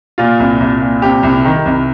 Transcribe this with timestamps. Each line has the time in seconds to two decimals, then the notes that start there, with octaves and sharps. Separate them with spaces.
0.18 A#2 F4
0.39 C2
0.60 C2
0.81 A#2
1.02 C3 G4
1.23 C2
1.45 D#3
1.66 C2